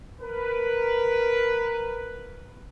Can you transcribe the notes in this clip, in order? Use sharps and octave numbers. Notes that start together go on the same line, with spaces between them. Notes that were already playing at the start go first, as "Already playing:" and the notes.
A#4 B4